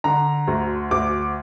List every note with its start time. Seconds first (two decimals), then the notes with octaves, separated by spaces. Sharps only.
0.04 D3 A#5
0.47 D2
0.91 D2 D6